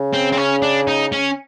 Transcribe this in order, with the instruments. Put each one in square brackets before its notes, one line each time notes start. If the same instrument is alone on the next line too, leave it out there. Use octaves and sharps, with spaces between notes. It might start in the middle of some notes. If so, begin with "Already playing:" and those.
Already playing: [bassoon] C#3
[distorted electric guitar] C4
C4
C#4
D4
D#4
C#4